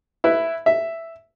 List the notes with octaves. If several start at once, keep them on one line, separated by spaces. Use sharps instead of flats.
E4 B4 E5
E5